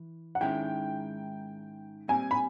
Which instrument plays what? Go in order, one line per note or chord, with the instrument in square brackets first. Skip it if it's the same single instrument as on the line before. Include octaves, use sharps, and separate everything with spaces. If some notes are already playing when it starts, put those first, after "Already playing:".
Already playing: [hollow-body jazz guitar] E3
[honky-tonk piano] F#5
[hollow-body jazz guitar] G#2 D#3 G#3 C#4 E4 [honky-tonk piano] G5
[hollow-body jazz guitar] A#2 G3 C4 [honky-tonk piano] G#5
[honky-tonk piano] B5